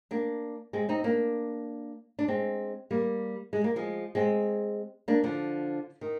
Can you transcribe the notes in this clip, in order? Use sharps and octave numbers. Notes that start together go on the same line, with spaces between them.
A#3 D4
G#3 C4
C4 D#4
A#3 D4
D4
G#3 C4
G3 A#3
G#3
A#3
F3 G#3
G#3 C4
A#3 D4
D3 F3
D#3